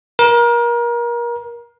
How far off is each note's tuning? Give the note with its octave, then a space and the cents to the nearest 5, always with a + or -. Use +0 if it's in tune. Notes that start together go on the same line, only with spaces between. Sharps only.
A#4 +30